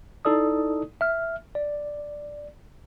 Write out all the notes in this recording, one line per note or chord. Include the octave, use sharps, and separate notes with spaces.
D#4 E4 A4 D5 D#6
E5 F6
D5